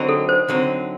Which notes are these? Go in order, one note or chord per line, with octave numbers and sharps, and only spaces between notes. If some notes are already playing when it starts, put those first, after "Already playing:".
Already playing: D3 F#3 C4 D#4
A4
C5
D3 F#3 C4 D#4